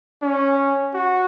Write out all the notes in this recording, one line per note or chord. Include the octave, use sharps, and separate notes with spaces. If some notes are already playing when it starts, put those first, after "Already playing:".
C#4
F#4